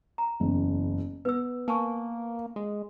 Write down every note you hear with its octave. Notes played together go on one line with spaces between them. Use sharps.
A#5
F#1 E2
B3 B4 E6
A#3 G#5 A5 C#6
G#3